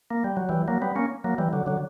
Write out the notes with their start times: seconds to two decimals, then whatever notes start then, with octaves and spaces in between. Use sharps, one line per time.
0.11 A#3
0.24 G3
0.37 F#3
0.49 E3 G3
0.68 F#3 A#3
0.82 G3 B3
0.96 A#3 C#4
1.24 F#3 A#3
1.38 E3 G3
1.53 D3 F#3
1.66 D3 F#3